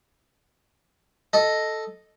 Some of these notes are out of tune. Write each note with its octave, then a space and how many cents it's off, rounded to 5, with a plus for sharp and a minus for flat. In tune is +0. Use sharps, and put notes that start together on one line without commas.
A4 +0 D#5 +0